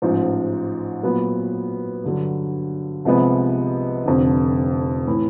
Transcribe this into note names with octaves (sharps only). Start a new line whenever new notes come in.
A1 G#2 F3
A#2 F#3 B3
G2 D3 F#3
C2 C3 F3 G#3 B3
F1 F2 D3
A2 E3